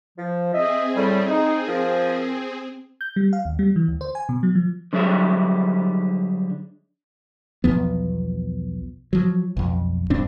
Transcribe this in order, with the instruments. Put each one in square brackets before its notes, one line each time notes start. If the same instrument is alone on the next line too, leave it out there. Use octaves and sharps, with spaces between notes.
[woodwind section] F3
[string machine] C4 G#4 [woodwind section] D#5 E5
[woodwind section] A2 G3
D#4
F3 A#4
[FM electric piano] G6
G3
F5
D#2
G3
E3
D2
C5
G#5
B2
F#3
F3
[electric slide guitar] D3 F#3 G3 G#4 E5
[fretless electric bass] B1 E2 F3 B3
F3 F#3
B1 F2
E1 G2 C4 D4